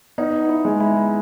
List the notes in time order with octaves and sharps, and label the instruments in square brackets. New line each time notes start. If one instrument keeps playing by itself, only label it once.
[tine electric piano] B3 [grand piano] D#4
[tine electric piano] E4
[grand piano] G#3
[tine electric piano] E4